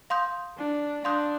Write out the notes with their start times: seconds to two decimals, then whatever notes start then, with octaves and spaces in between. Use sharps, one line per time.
0.10 F5 C6 D#6 G6
0.58 D4
1.04 D4 F5 C6 D#6 G6